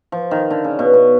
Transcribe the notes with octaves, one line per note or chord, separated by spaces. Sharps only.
F3
D#3
D3
C#3
B2
B2